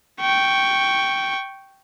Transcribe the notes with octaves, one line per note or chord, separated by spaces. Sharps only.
G5 C#6